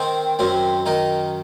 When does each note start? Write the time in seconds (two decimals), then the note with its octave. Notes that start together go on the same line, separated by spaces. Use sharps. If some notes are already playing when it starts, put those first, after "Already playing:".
Already playing: D#3 C4
0.39 F#2 C4
0.86 D#3 D#4